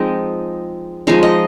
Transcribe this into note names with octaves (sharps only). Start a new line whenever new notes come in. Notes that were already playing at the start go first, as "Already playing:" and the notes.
Already playing: F3 G#3 C4 D#4 G5
F3 G#3 D#4 F5
D#5